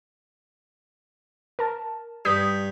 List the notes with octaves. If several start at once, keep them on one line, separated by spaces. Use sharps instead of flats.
A#4 A5
G2 D#6 G6 B6